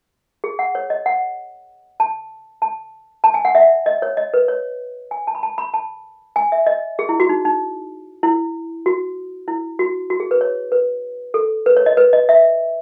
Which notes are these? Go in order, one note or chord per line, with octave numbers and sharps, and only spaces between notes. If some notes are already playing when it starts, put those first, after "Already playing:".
G#4
F#5
C#5
D#5
F#5
A5
A5
A5
G#5
F#5
E5
D#5
C#5
D#5
B4
C#5
G#5
A5
B5
A5
B5
A5
G#5
E5
D#5
G#4
E4
F#4
D#4
D#4
E4
F#4
E4
F#4
F#4
G#4
B4
C#5
B4
A4
B4
C#5
D#5
B4
D#5
E5